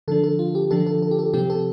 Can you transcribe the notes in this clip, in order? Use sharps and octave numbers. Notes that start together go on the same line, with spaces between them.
D3 F3 D4 A4
A4
F4
G4
D3 F3 D4 A4
A4
A4
G4
A4
C3 F3 C4 G4
A4